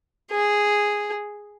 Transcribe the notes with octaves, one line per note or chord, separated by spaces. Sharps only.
G#4